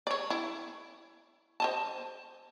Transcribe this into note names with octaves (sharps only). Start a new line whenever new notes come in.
C#5 D5
E4
C5 D#5 A5